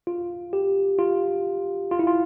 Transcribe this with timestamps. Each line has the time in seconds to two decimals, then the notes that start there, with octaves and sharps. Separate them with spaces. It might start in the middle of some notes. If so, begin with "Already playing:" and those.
0.07 F4
0.53 G4
0.98 F4
1.91 F4
1.99 E4
2.07 F4